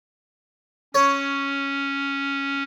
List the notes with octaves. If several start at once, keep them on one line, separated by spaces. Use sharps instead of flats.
C#4 C#5